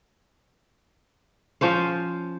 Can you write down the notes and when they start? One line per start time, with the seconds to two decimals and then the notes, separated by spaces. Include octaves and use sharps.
1.61 F3 C#4 C5 F5